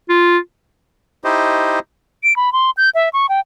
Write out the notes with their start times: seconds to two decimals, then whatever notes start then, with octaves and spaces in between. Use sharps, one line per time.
0.09 F4
1.24 D#4 E4 G4 C5 D#5
2.23 D7
2.36 B5
2.53 C6
2.77 G6
2.95 E5
3.13 C#6
3.29 G5